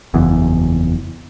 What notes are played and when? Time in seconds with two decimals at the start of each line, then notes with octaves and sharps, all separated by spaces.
0.14 F#1 E2